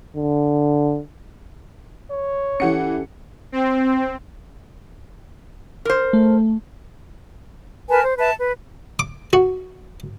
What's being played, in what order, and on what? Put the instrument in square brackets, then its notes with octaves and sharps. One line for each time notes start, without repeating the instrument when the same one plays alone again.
[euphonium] D3
[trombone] C#5
[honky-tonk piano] E3 F#5 C#7 [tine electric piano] C#4 G4 A4
[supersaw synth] C4
[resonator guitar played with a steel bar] A#4 C5
[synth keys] A3
[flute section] A#4 B4 G#5 A5
C5
B4 E5 A5
B4
[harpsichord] D6
F#4